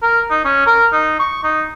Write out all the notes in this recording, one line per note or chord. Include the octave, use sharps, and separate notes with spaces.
A#4
D#4
C#4
A#4
D#4
C#6
D#4